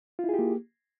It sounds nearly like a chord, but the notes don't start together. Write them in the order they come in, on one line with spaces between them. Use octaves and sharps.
F4 E4 G#4 G4 A#3